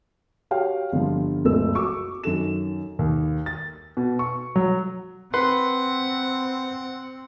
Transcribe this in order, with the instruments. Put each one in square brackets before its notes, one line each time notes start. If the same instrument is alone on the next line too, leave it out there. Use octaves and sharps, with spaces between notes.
[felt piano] F#4 G4 C#5 F5 G5
G1 D3 F3 G3
F#1 C#2 A#2 A3 A#4 E6
F#4 C#6 D6 E6
F#2 D#3 A4 E7
[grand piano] D#2
A6
B2
C#6
F#3
[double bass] C4 [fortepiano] B4 [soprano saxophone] F#5 [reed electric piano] C6